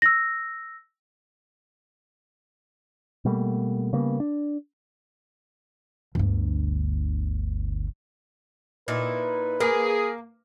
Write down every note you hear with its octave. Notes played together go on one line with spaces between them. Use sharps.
E6 A#6
B2 G3 A3 A#3
C#3 G3 A#3 B3
D4
G1 D2
A#2 D#4 E4 B4
A#3 G#4 A#4